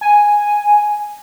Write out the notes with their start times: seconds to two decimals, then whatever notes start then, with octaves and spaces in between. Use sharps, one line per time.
0.01 G#5